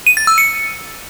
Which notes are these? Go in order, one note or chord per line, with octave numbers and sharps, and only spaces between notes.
D#7
A6
E6
C#7